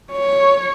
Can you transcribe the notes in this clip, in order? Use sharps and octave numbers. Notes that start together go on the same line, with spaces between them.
C#5